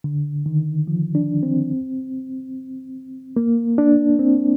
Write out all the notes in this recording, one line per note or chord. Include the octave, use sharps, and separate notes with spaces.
D3
D#3
F3
D4
C4
A#3
D4
C4